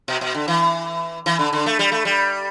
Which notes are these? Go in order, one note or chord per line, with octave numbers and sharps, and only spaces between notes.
B2
B2
D3
E3
E3
D3
D3
A3
G3
A3
G3